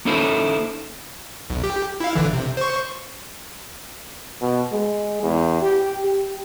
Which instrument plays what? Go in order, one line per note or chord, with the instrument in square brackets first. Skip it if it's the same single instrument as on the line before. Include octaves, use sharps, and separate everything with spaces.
[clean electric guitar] A#3 C#4 D#4 E4 A4 C5
[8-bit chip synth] B1
G4
E4 F5
A1 D3 E3
C3
C5 C#6
[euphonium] B2
G#3
E2
G4
G4